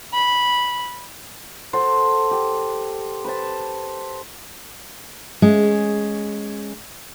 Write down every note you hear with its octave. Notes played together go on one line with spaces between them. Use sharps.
B5
F#4 A4 C5
G4
B4 C5 A5
G#3 C#4